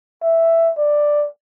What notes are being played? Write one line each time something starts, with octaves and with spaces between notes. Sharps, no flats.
E5
D5